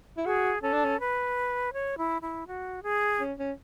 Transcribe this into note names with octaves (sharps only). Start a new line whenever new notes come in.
E4
F#4 G#4
C#4 A4
D4
C#4
B4
C#5
E4
E4
F#4
G#4
C#4
C#4